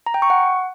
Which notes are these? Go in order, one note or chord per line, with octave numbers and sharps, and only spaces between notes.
A#5
G5
C#6
F#5